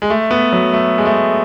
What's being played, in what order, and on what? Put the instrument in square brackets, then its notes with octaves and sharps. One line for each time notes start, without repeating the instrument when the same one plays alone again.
[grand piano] G#3
A3
B3
F#3
A3
G#3
A3